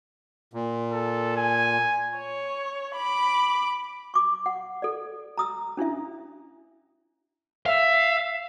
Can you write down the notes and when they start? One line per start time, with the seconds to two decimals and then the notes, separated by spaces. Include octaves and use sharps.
0.54 A#2
0.93 A4
1.36 G#5
2.17 C#5
2.96 B5 D6
4.14 C#6 D6
4.46 F#5
4.82 A4 D5
5.38 A#5 D#6 E6
5.77 C#4 D4 E4 E5
7.66 E5 F5